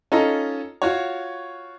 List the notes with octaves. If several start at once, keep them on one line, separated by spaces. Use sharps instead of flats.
C#4 D#4 F4 A4 D#5 A#5
F4 F#4 C#5